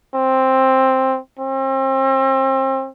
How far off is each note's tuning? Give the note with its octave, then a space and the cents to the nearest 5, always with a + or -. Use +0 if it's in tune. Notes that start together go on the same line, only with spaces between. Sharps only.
C4 +10
C4 +35